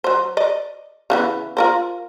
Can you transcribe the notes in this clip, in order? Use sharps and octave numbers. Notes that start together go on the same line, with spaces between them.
F#3 C5
D5 D#5
C#3 E3 B3
F4 A#4 C5